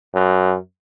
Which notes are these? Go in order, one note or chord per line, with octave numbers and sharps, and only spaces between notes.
F#2